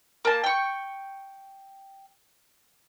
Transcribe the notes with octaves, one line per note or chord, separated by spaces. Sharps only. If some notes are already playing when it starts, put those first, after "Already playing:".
A#3 A5
G5 C#6